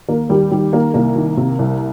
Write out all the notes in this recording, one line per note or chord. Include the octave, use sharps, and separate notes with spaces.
D#2 A#3 A#4
D#2 G3 G4
D#3 G3 G4
D#3 A#3 A#4
C2 A#3 A#4
D#3
C3
C2